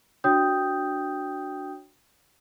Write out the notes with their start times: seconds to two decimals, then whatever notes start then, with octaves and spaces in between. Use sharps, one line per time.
0.24 D4 F#4 C#5 G5 D#6 G6